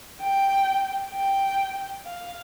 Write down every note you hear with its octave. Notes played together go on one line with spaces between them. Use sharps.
G5
G5
F5